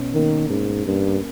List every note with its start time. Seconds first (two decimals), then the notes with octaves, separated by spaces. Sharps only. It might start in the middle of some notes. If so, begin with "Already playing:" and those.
Already playing: B2 C#4
0.14 D#3 A#3
0.49 G#2 C#4
0.86 G2 A#3